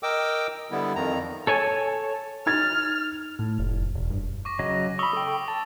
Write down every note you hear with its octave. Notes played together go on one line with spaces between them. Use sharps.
A#4 D#5 G5 D6 E6
D3 G3 B3 E4
F2 D#3 A#5
A4 C#5 G#5
D#4 F6 G#6 A6
A2
F1
E1
G2
C#6 D6 A#6
C#3 F#3 D#5
B5 C#6 D#6 E6 G7
A4 G5
A5 A6